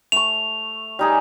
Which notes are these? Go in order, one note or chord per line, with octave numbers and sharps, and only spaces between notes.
A3 C#6 F7
G3 D#4 G#4